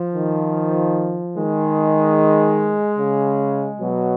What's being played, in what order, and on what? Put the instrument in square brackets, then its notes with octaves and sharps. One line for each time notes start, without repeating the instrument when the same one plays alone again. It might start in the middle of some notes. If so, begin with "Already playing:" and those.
Already playing: [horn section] F3
[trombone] D#3
[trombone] D#3 [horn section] G#3
[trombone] C#3
[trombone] B2 [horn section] F#3